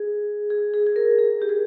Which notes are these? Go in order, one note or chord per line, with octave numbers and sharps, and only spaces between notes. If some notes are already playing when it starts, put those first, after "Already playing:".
Already playing: G#4
G#4
G#4
G#4
A#4
G#4
G4
G#4